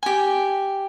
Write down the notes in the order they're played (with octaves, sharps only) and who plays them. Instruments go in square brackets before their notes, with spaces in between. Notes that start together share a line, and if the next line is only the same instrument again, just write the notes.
[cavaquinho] G4 G#5